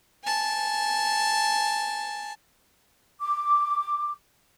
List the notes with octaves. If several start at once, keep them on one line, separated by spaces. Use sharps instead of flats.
G#5 A5
D6